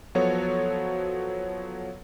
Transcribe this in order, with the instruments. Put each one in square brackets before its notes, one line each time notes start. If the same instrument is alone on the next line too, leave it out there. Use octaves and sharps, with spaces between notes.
[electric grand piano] F3 F#3 B3 F#4 A4 C#5